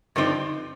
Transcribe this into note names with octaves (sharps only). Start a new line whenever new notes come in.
G2 D3 F3 C4 D#4